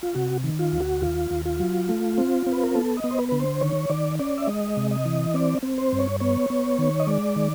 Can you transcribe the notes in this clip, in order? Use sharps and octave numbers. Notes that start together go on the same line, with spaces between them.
F4
C3 F#4
D#3
F4
D2
F#4
D#2 F4
D#2
F4
F#3
A3
C4
C4
B4
A#4
B3 A4
D#5
B3
C5
B4
D3 B4
C5
D#3 C#5
D#3 D5
C#4 D5
E5
G#3 D#5
C3
D#5
E3
C4 D5
C4
C5
G2
C#5
B3 C#5
B3
D#3
D#5
G#3 D5
D#3